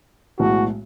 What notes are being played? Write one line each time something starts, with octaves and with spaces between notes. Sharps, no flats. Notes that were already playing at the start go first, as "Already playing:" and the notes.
B1 A2 E3 G#3 F#4